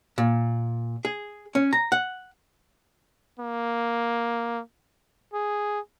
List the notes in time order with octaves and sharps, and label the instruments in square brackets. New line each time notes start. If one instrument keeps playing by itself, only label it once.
[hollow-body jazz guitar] A#2
G#4
C#4
A#5
F#5
[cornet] A#3
G#4